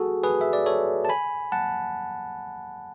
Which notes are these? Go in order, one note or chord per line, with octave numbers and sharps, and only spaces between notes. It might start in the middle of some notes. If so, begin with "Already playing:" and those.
Already playing: F#4 G#4 A4
G#4 B4
E5
D5
A4 C#5
A5
G#5 B5
F#5 A5